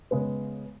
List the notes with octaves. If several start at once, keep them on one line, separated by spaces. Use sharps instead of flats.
C#3 G#3 B3